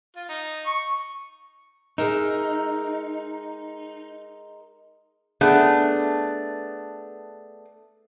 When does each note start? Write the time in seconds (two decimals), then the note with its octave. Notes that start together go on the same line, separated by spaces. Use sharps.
0.16 F4
0.29 D#4
0.66 C#6
1.98 G#3 D#4 A#4 E5
5.41 A3 B3 D4 G#4